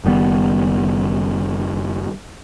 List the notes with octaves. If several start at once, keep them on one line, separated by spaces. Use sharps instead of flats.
F#1 D#3 G3 B3